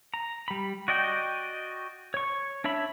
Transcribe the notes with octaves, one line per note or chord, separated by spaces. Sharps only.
A#5
G3 B5
F#4 D5 D#5 G5
C#5 C#6
D4 C#5 E5 B5